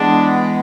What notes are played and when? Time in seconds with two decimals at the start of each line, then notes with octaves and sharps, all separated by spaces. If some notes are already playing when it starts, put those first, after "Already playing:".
Already playing: E3 G#3 B3 D4